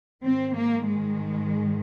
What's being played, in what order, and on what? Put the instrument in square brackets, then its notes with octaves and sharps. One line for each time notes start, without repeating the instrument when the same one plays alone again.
[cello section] G#2 D#3 C4
A#3
G#3